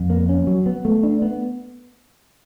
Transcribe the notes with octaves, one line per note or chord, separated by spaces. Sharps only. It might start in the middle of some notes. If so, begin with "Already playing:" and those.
Already playing: F2
A#3
C#4
F#3
B3
A3
D4
B3